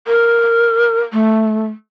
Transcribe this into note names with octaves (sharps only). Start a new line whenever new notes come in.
A#4
A3